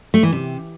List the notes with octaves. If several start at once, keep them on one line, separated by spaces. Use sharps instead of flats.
A3
E3
C3